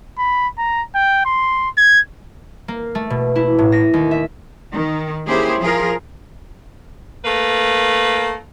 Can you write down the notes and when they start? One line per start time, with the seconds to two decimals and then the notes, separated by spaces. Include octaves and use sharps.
0.19 B5
0.58 A#5
0.95 G5
1.26 C6
1.78 G#6
2.68 A#3
2.95 A3
3.10 B2
3.35 E4
3.59 A2
3.72 A#6
3.94 D#2
4.11 E5
4.73 D#3
5.27 A#3 C#4 E4 G4 G#4 C5
5.60 F3 F4 G#4 A#4
7.25 A3 A#3 B4